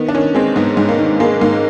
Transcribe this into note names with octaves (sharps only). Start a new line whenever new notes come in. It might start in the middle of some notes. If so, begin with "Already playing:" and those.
Already playing: D#3 B3
D4
D#3 C#4
G#3 C4
G#2 B3
G#2
A#3
D#3
G#3 A#3
G#2 A#3